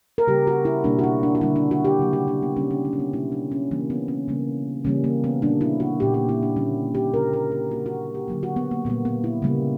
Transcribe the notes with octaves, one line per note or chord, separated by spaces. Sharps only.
A#4
C#3 G3 A#3 G4
F#4
E4
B2 G3 A#3 D4
F#4
E4
D4
F#4
D3 G3 A#3 E4
D4
F#4
G4
C#3 F#3 A#3
F#4
D4
B3
C#3 G3 A#3 C#4
D4
D4
C#4
B3
B2 A#3 E4
D4
C#4
C#3 E3 G3 A#3
B3
C#4
C#3 G3 A#3
C#3 E3 G3 A#3 C#4
A#3
B3
A#2 G3 A#3 D4
E4
F#4
A#2 A#3 G4
G4
E4
D4
D3 G3 A#3 C#4
G4
C#3 G3 A#3 A#4
A#4
G4
C#3 G3 A#3 F#4
F#4
G4
D3 F#3 A#3
F#4
B3
A#3
A#2 G3 A#3 B3
B3
E4
C#3 G3 A#3